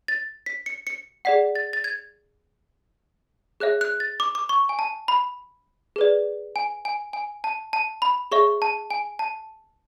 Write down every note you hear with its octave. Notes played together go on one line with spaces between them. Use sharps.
A6
B6
C#7
C#7
G#4 D5 F#5 B6
A6
A6
G#6
G#4 C#5 E5 F#6
F#6
A6
D6
D6
C#6
G#5
A5
B5
G#4 B4 D5
G#5
G#5
G#5
A5
A5
B5
G#4 C#5 E5 C#6
A5
G#5
A5